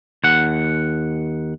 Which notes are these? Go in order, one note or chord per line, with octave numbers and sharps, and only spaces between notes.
D#2 F#5